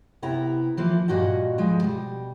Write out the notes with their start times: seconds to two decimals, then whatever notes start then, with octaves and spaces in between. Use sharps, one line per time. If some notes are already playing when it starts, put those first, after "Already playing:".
0.22 C3 B3 E4 A#5
0.77 E3 F3 A#3
1.08 G2 A#2 F#4 D#5 A5
1.58 D2 F3 G#3
1.82 B2 G3